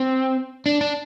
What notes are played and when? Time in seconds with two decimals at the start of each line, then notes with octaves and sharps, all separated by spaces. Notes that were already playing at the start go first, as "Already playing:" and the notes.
Already playing: C4
0.66 D4
0.81 D4